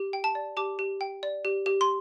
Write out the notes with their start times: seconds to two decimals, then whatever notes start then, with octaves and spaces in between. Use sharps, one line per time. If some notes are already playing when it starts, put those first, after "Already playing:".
Already playing: G4
0.13 G5
0.24 A5
0.35 D5
0.57 G4 A5 D6
0.79 G4
1.01 G5
1.23 D5
1.45 G4
1.66 G4
1.81 C6